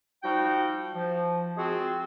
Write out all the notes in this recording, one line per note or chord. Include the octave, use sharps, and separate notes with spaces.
F3 G3 D#4 F#4 G5
F3
G#3 C4 F4 F#4 G#4